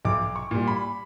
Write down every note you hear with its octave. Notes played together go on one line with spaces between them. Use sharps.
B1 D6
C#6
A#2 G3
B5